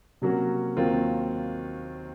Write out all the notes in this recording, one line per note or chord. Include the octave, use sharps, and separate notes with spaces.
C3 F#3 A#3 C#4 F#4
D#2 D#3 F#3 C4 F4